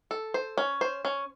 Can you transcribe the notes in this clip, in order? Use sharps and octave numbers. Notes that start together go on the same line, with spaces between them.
A4
C5
C#4
C5
C#4